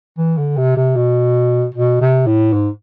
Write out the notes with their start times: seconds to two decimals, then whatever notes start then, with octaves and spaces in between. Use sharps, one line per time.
0.18 E3
0.38 D3
0.57 C3
0.77 C3
0.96 B2
1.74 B2
2.01 C3
2.27 A2
2.53 G#2